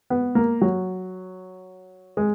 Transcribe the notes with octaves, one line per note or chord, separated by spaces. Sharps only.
B3
A#3
F#3
G#3